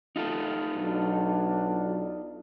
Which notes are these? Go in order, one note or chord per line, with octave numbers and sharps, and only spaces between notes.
D#4 F4 A4
B1 F#3 D4